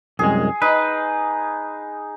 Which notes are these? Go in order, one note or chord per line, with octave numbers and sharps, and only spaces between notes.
C2 F#2 G#3 G#4
D#4 B4